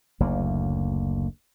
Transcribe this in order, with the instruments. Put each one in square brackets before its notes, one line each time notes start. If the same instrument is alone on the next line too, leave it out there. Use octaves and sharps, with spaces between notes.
[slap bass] F#1 D2 A#3